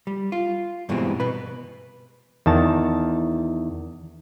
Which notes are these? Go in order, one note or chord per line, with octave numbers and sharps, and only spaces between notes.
G3
F4
G2 B2 E3 G#3 C4
B2 B4 B5
E2 D#3 A5